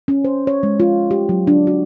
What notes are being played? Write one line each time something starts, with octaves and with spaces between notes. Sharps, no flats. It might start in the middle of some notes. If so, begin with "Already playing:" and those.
C#4
C5
C#5
G#3
F4
G4
F#3
D4
F#4